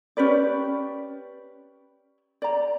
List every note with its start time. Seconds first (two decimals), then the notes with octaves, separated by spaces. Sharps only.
0.17 C#4 G4 B4 D5
2.42 D5 A#5